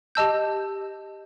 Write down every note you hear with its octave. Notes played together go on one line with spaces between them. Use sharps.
G4 D#5 A5 E6 G6